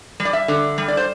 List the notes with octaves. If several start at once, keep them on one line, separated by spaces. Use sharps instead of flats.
G3
D5
E5
D3
G3
D5
C5